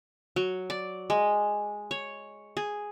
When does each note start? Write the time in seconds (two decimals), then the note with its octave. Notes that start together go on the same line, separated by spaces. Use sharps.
0.36 F#3
0.70 D5
1.10 G#3
1.91 C#5
2.57 G#4